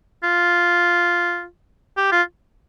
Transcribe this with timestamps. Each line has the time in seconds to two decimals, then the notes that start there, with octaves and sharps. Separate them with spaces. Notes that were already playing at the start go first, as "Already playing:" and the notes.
0.23 F4
1.97 G4
2.12 F4